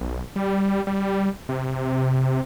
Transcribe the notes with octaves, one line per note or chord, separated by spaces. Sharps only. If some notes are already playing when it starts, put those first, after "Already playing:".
B1
G3
G3
C3